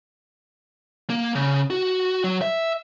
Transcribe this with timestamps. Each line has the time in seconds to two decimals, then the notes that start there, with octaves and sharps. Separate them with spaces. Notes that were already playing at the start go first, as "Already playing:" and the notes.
1.10 A#3
1.35 C#3
1.70 F#4
2.24 F#3
2.42 E5